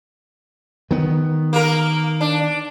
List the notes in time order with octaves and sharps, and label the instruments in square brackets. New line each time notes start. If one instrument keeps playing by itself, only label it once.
[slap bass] D#3 B3
[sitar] A#3 A#4
D4